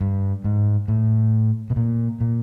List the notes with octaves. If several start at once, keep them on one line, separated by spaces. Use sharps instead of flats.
G2
G#2
A2
B2
A#2
A#2